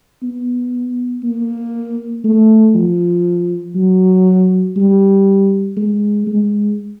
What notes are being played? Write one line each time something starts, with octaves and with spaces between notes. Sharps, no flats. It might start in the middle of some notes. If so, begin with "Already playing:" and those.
B3
A#3
A3
F3
F#3
G3
G#3
G#3